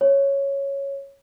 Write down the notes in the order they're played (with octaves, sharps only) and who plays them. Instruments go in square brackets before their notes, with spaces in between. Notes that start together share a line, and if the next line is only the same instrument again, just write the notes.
[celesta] C#5